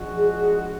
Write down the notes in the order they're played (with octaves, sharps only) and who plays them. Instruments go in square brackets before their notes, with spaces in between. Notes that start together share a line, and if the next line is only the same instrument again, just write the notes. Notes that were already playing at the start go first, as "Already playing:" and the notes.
Already playing: [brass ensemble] F3 G#3 D4 F#4
[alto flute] G#4
G#4